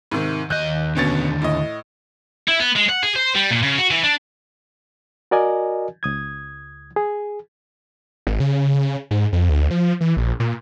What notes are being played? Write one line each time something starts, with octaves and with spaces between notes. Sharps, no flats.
G#2 C3 D#3
D#2 D#5 F#6 G6
D#2 B2 D3 C#4 A6
A2 D#5
E4
B3
G#3
F#5
G#4
C5
G3
A#2
C#3
F#4
E3
D4
F#4 A#4 D5 D#5 G#5
C#2 D#6 G#6
G#4
G#1
C#3
C#3
G#2
F2
D2
F3
E3
A#1
A#2